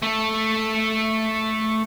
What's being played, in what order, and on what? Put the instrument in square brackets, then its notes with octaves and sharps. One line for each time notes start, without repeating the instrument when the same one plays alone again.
[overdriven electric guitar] A3 A4